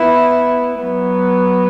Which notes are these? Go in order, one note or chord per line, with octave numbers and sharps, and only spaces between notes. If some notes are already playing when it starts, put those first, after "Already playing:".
Already playing: B3 E4
F#3 B3